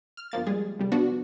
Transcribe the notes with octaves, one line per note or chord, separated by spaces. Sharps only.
F6
G1 F3 A#3 A6
G3 G#3 G#4
C2 G3
F3 B3 D4 F#4